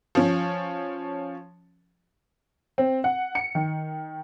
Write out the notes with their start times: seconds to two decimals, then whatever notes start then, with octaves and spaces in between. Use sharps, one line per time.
0.15 F3 C#4
2.78 C4
3.04 F#5
3.35 C#7
3.55 D#3